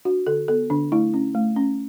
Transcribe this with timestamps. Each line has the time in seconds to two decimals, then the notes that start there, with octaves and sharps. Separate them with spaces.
0.05 D4 F#4
0.27 D3 A4
0.48 B3 A4
0.70 D3 D4
0.92 A3 E4
1.14 C#4
1.35 A3
1.56 C#4